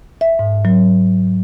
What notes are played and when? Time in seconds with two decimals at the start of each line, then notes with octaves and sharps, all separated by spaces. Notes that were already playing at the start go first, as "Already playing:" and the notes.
0.21 E5
0.39 G#2
0.65 F#3